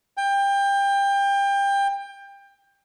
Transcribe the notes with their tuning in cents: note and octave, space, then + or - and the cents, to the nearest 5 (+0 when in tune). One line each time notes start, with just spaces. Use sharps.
G5 +25